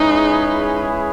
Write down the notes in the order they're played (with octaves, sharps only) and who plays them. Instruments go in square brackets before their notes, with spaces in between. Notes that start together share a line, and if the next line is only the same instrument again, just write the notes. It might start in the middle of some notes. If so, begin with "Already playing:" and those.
Already playing: [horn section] G#3 C#4 E4 G#4 B4 [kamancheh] D#4